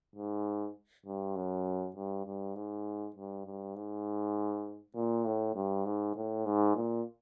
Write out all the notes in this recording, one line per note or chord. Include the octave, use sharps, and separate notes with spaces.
G#2
G2
F#2
G2
G2
G#2
G2
G2
G#2
A#2
A2
G2
G#2
A2
G#2
A#2